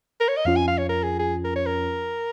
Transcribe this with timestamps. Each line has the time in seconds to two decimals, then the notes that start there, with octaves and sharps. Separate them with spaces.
0.21 A#4
0.29 C#5
0.37 D#5
0.45 F2 F3 C#4 F4 F5
0.56 G#5
0.68 F5
0.78 C#5
0.89 A#4
1.03 G#4
1.19 G#4
1.44 A#4
1.56 C#5
1.66 A#4